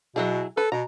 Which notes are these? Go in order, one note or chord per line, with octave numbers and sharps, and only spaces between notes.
B2 F#3 E4 G#4
A4 B4
B2 A#5